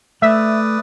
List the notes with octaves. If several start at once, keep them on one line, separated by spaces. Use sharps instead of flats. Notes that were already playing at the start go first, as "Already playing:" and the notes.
A3 B4 D5 E5 D#6